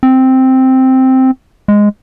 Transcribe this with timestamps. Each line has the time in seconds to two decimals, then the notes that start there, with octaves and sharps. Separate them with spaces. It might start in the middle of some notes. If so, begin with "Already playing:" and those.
0.03 C4
1.68 G#3